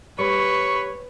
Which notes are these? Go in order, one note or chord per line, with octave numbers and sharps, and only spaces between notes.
G3 B4 C#5 C#6